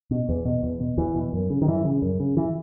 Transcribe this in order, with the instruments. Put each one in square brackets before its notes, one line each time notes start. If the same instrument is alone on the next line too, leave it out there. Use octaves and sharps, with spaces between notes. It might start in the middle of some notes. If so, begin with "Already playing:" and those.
[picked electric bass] B2
E2
B2
E2
B2
E2 E3
B2
F#2
C#3
D#3
F#2 E3
C#3
F#2
C#3
E3